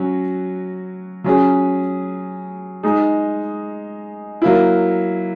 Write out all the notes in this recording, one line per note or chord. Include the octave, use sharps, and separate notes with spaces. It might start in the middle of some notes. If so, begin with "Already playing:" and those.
Already playing: F#3 C#4 F#4
F#3 C#4 G#4
G#3 D#4 G#4
F#3 A#3 E4